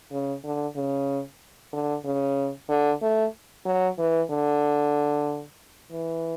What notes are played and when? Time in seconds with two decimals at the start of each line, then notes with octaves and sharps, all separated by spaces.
0.12 C#3
0.44 D3
0.76 C#3
1.73 D3
2.05 C#3
2.69 D3
3.02 A3
3.65 F#3
3.98 E3
4.30 D3
5.91 E3